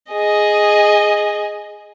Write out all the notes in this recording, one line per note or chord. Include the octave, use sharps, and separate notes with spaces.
G#4 D#5